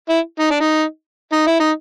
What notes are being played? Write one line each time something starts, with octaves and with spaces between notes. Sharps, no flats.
E4
D#4
D4
D#4
D#4
E4
D#4